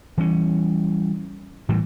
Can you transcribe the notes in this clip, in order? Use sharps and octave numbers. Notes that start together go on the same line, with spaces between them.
E3 G3 C#4
A2 E3 F#3 G3